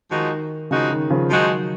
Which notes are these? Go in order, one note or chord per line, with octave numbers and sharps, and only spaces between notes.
D#3 F3 G#3 D#4 F#4
C#3 F3 G#3 D#4 F#4
D#3
C#3 F3
D#3 F3 F#3 G#3 D#4 F#4